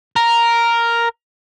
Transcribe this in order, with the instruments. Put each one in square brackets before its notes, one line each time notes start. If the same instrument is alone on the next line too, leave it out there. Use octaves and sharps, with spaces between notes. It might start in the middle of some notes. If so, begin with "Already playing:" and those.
[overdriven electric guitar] A#4